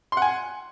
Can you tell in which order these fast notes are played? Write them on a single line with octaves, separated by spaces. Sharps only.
C6 F#5 G#5